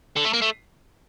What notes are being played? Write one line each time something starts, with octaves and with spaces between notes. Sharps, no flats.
D3
A3
A#3
A3